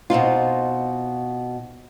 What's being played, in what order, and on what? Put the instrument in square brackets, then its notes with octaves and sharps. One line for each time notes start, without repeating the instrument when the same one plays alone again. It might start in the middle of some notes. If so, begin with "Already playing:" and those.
[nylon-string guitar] B2 C4 D#4 F4